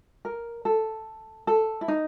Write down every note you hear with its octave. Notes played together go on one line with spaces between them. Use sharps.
A#4
A4
A4
E4
D#4